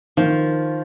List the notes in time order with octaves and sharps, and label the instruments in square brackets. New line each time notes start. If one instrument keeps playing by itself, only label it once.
[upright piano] D#3 [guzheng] F3